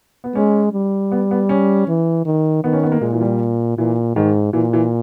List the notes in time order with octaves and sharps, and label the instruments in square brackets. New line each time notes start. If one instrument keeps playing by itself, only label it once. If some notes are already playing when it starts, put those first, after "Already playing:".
[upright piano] B3
[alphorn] G#3 [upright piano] C#4
[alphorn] G3
[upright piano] B3
B3
C#4
[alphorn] E3
D#3
[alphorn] D#3 [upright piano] B3
[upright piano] C#4
B3
A#3
[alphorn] A#2 [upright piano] G#3
[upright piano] E3
G3
[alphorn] A#2 [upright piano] E3
[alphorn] G#2 [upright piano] D#3
[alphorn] A#2 [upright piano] E3
[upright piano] E3